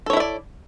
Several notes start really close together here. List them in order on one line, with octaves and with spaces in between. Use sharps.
A4 C#5 E4 E5 D5